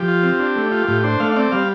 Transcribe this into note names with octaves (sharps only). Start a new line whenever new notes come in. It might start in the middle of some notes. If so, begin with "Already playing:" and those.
Already playing: F3 G4
F4
C4
D4
A3
F4
A2 G4
D4 C5
A3 F5
F5
C4 D5
G3 F5